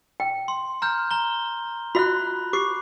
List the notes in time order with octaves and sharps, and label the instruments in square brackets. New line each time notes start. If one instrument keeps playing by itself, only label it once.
[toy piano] G5
[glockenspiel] C6
A#5 F6 G6
A#5 G7
[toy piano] F4 F#4 E5 [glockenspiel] B5 F#6
[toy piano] G4 [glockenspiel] D6 C7